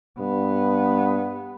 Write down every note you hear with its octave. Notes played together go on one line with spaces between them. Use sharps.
G2 B3